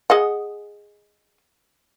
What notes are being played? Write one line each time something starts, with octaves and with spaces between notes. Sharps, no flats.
G#4 D#5 F#5